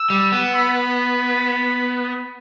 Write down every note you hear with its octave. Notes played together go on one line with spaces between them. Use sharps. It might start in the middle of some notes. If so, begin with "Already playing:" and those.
Already playing: E6
G3
B3
B5